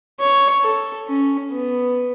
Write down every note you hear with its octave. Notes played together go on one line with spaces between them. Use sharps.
C#5
A4
C#4
B3